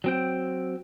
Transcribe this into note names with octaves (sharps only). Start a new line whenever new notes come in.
F#3 C4 G5